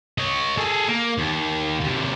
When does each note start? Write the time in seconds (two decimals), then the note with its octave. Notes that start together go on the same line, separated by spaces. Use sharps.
0.18 C#5 D#5
0.57 G#4 A4
0.88 A#3
1.18 D#2
1.80 D#2 C3